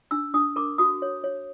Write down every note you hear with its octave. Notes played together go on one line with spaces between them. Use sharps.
D4 E6
D4 D#6
A#4 D6
F#4 D#6
C#5
C#5